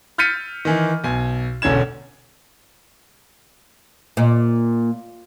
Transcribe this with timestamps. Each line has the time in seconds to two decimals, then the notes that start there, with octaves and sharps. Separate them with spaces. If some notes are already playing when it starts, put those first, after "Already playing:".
0.18 F6 G6 A6 B6 C#7 D#7
0.65 D#3 E3
1.04 B1 G#5
1.62 E1 D3 C#4 G#6 E7
4.17 A#2